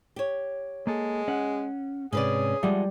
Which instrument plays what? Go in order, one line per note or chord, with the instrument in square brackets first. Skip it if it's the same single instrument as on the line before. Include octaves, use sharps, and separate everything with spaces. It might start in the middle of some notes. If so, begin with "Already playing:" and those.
[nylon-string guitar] G4 C#5
[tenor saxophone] G#3 [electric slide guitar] A#3 A4
[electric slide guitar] C#4 [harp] F#5
[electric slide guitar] G#2 C3 [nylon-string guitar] C#4 B4 D5 [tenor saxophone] G#4
[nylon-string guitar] F3 G#3 [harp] G3 [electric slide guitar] E5 F#5